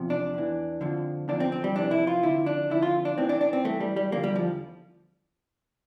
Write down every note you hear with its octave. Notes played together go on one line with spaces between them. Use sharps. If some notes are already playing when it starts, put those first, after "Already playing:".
Already playing: E2 C3 F3
D4
E2 E3
F2 D3 F3
E2 D3 F3 D4
C4
C4
G3
F2 C3 E3 D4
E4
F4
F2 D3 F3 E4
D4
F2 D3 F3 E4
F4
D4
A2 E3 C4
D4
D4
C4
G2 E3 A3
G3
G3
E2 D3 F3 A#3
G3
F3